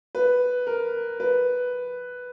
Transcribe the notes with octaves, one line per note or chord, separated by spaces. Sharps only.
B4
A#4
B4